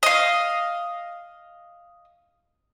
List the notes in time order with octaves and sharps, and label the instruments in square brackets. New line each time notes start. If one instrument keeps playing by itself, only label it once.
[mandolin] D#5 F5